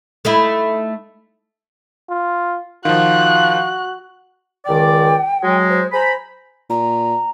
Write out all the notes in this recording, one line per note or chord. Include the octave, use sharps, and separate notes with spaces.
A3 D#4 E4
F4
D#3 F3 F4 F#4 F#6
C#2 D#3 D5 G5
F#3 G#3
C5
C5 G#5 A#5 B5
A#2 A#5